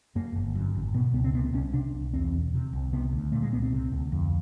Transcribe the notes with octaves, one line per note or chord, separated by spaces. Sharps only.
F#2 A#3
G1
F#2
G#1
B2 B3
C#2 B3
C4
C3 B3
B3
C2 C#4
C3 D4
C2
E2 C4
E1
C3
C2
C3 B3
D2
A#2 A3
G#3
C2 B3
C4
C3
D2
F2